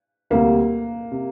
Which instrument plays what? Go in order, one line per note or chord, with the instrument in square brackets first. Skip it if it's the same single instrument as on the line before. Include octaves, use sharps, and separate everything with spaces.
[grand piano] D2 C3 G3 [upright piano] A#3
[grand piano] C3